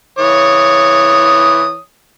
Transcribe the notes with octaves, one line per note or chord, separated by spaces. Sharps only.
E3 C#5 D#6